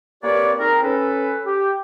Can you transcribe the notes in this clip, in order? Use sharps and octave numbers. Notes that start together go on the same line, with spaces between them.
A#3 C4 G4 B4 C#5 D5
C4 D#4 G#4 A#4
C#4 A4 B4
G4